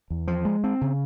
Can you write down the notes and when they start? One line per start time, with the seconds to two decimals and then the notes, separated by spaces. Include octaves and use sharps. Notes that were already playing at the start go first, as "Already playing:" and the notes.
0.10 E2
0.28 F3
0.45 G#3
0.64 C4
0.81 C#3